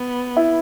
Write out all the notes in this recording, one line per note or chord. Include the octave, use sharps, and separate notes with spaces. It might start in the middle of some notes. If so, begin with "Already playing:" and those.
Already playing: B3
E4